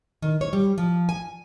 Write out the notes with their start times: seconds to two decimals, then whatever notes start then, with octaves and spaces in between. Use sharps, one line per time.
0.22 D#3
0.41 C#5
0.53 G3
0.78 F3
1.09 G#5